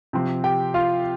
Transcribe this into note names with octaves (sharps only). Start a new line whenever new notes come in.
C3 F3 C4
G4 G5
F4 F5